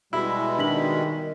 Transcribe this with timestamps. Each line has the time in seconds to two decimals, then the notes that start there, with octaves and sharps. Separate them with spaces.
0.13 B2 G3 G#3 E4
0.59 D#3 D4 B6 F#7